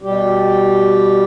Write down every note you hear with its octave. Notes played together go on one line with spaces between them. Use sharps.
B2 G3 G4